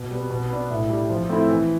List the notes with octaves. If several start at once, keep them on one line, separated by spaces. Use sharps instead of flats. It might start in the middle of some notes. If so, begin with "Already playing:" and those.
Already playing: B2
G3 B3
B2
B3 D4
A2
G3 D4
F3
A3 C4 E4
E3